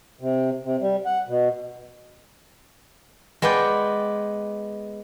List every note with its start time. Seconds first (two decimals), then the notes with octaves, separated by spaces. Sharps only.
0.21 C3
0.64 C3
0.81 G3
1.05 F#5
1.28 B2
3.42 G#3 B3 B4 D5 G5